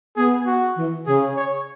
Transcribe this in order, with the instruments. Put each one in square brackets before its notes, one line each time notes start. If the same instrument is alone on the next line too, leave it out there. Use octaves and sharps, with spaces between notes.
[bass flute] B3 [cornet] G#4
[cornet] F#4
[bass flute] E3
[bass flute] C#3 [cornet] G#4
[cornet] C#5